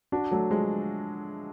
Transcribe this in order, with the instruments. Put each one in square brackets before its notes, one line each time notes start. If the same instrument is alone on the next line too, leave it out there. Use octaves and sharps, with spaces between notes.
[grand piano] D4 F#4
F#3 A3
F3 G#3